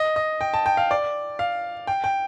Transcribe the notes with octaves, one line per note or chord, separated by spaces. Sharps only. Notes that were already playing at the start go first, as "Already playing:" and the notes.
Already playing: D#5
D#5
G5
A5
G5
F5
D5
F5
G5
G5